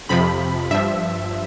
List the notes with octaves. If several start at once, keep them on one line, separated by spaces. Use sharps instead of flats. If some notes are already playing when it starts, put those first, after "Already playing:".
F2 C3 F3 B5
G2 F3 E5